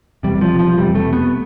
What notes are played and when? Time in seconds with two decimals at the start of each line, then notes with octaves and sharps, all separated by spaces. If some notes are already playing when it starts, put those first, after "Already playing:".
0.23 E1 E2 C3 G3
0.41 F3
0.59 F3
0.77 E1 E2 C3 G3
0.95 A3
1.13 B3